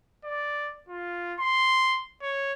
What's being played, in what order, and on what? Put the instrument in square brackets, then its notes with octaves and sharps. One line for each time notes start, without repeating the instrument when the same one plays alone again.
[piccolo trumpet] D5
F4
C6
C#5